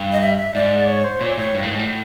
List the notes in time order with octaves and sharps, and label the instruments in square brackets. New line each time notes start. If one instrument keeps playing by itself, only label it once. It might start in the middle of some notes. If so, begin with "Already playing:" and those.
Already playing: [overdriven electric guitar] G2
[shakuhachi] D#5
E5
E5
[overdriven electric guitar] G#2 [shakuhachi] D5
[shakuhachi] C#5
C5
[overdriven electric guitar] A#2 [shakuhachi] C#5
[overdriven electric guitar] A2 [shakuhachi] C#5
[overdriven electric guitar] G2
A2
G#2
A2